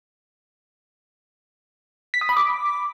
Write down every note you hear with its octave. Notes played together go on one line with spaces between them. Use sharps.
B6
D#6
B5
D6